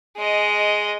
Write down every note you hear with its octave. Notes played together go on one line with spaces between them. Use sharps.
G#3 D#5